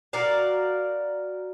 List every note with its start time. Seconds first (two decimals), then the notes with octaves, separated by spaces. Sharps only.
0.13 F#4 A#4 D5 F5